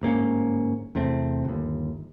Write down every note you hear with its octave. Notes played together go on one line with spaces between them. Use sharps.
G1 G#2 A#3 C#4
E2 C3 A3 C4
G1 D#2